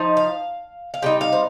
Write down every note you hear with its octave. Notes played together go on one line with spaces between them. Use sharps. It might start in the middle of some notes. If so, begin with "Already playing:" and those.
Already playing: F3 D#4
F5
F5
C3 G3 D#4 G5
F5
C5